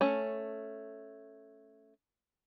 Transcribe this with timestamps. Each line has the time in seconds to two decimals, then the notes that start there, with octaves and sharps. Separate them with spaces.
0.01 A3 C#4